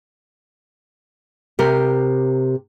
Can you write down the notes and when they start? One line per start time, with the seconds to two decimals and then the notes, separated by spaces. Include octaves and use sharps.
1.59 C3 G4 A#4